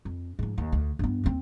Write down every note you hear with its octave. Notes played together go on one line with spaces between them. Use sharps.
F2
G#2 F3
D#2
D2
G2 B3
D#2 C4